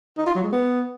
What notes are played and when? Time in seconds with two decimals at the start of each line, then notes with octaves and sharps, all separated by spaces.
0.17 D#4
0.26 F4
0.35 F#3
0.44 G#3
0.52 B3